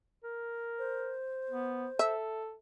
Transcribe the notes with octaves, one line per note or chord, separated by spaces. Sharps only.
A#4
C5
B3
A4 E5